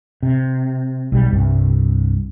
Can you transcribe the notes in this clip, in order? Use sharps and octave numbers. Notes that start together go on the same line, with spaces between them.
C3
B1 G3
C2 G2